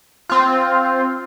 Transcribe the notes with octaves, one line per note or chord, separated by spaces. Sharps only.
C4 F4